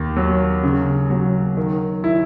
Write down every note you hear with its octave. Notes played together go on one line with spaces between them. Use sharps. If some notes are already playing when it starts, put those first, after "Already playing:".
Already playing: D#2
F#3
C#3
F#3
D#3
E4